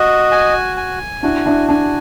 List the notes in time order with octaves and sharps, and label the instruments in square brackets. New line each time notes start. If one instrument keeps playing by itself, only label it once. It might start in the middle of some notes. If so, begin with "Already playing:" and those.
Already playing: [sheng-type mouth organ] F#4 D#5
G#5
G#5
[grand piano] D4 E4 [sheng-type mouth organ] F#4
[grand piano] D4 E4
[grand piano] D4 [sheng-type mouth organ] G#5